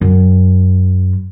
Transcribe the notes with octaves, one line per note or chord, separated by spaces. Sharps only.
F#2